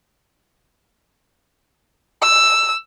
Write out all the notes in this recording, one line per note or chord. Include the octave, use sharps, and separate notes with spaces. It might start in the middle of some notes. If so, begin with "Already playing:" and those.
E6